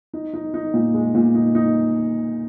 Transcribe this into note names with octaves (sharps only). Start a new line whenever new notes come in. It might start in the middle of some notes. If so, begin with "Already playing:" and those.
D#4
D#4
D#4
A#2
G#3
A#2
D#4
D#4